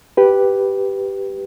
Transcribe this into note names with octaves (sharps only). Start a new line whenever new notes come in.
G4 B4